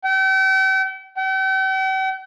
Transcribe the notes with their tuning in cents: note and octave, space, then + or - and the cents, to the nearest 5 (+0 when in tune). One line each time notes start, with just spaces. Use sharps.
G5 -40
G5 -45